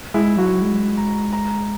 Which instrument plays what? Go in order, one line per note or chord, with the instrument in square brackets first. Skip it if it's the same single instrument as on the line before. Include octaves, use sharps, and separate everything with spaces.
[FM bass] G#3 [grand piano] E4
[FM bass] F#3 [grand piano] F#4
[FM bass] G#3
[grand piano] A#5
A#5